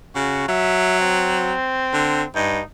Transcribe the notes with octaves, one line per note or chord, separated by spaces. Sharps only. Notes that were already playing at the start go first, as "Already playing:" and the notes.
C#3 F#4
F#3 E5
C4
D3
G2 D#4